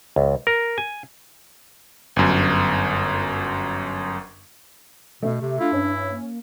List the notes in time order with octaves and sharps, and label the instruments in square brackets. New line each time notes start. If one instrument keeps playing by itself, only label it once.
[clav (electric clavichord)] C#2
A#4
G#5
[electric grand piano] G1 F#2
[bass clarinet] B2 [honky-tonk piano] A3
[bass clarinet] C3 [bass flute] G4
[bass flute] D4 [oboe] E4 [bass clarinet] F4
[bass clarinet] G2 [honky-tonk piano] C#4
[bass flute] A#3